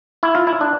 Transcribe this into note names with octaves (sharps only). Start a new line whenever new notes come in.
E4
F4
E4
D4